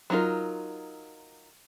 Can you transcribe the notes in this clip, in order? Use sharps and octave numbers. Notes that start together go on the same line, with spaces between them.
F#3 B3 D#4 F4 A#4